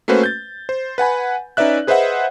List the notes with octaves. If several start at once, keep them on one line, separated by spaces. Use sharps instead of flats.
A3 A#3 C#4 F#4 B4 C5
G6 A6
C5
B4 F#5 G#5 B5
C#4 D#4 B4 D5 E5 F#6
G#4 B4 C5 D#5 E5 F#5